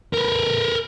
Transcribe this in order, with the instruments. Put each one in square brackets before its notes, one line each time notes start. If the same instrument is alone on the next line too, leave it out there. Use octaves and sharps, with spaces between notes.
[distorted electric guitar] A#4 B4